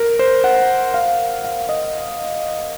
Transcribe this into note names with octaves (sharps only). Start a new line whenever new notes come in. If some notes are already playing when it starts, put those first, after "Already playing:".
Already playing: A#4
C5
F#5
F5
F5
D#5